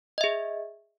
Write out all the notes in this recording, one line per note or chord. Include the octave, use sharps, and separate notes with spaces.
G#4 D#5 E5